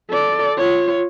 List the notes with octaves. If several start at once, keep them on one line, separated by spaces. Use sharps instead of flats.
A4 D5
F4 C#5